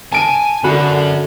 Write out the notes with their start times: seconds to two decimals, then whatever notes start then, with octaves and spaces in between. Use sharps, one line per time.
0.12 G#5 A5 D7 D#7
0.64 F#2 D3 F#4 B5